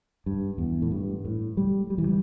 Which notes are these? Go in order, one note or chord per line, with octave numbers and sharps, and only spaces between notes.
G2
E2
A2
G2
A2
G3
G3
E3
G3